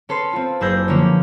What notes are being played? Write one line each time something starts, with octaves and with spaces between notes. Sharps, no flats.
C#4 A4 B4 C6
C4 F4
F#1 G#4 B4 E6 G6 A#6
D3 F3 A#3 C#4